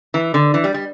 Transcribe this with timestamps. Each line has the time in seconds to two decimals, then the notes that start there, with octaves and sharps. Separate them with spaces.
0.14 E3
0.34 D3
0.54 E3
0.64 G3
0.74 G3